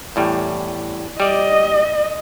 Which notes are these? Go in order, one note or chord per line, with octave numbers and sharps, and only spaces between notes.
E2 A2 G3
G3 D5 D#5